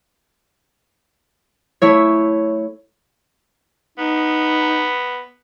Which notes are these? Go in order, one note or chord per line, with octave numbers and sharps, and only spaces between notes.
A3 E4 C#5
B3 D#4